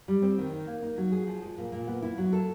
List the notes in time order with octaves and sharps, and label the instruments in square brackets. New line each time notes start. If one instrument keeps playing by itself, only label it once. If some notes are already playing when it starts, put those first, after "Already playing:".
[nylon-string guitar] G3
C4
D#3
D#4
A#3
D#4
F#3
G#4
F3
G#3
A#2
A#2
B3
E4
F#3
A4